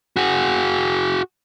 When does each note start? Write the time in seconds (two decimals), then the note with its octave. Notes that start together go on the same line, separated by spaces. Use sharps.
0.16 F#4 G#4